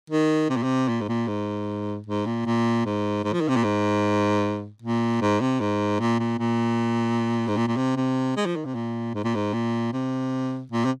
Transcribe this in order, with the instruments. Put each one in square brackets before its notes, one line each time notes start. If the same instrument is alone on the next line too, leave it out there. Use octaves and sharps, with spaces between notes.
[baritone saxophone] D#3
C3
A#2
C3
A#2
G#2
A#2
G#2
G#2
A#2
A#2
G#2
G#2
F3
D#3
C3
A#2
G#2
A#2
G#2
C3
G#2
A#2
A#2
A#2
G#2
A#2
A#2
C3
C3
G#3
F3
D#3
C3
A#2
G#2
A#2
G#2
A#2
C3
A#2
C3